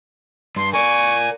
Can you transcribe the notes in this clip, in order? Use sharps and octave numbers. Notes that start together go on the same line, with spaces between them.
G2 C6
A#4 D5 G#5 C#6